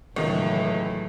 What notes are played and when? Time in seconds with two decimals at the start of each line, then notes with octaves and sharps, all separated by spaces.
0.16 C#2 A2 D#3 E3 F#3